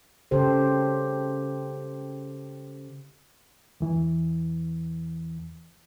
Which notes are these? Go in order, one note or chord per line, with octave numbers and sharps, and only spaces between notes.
C#3 G4 A4 C5
E2 E3